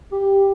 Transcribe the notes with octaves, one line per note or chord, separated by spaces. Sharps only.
G4